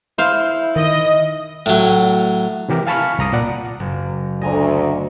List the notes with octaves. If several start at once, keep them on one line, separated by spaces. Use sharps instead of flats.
E4 C5 F5
D#3 D#5
A2 F#3
C3 E3 G4 A#4
F5 G#5 A5 B5 C#6 F6
C2 A#5 D#6
A#2 D5 F#5
F#1
D2 D#5 G#5 A#5